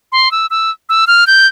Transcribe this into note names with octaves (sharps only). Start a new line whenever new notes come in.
C6
E6
E6
E6
F6
G6